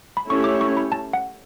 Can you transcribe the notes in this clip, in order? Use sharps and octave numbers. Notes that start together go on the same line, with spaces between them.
B5
A3 C#4 E4 G4 C#5 C#6
D6
C#6
B5
A5
F#5